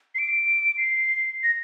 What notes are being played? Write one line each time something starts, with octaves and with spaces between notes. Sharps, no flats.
C7
D7
C7
A#6